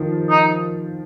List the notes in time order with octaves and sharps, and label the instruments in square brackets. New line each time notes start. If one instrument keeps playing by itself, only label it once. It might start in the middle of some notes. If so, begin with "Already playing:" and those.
Already playing: [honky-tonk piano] D#3 F3
[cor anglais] D#4